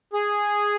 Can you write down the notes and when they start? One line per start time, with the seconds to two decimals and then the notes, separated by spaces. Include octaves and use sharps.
0.13 G#4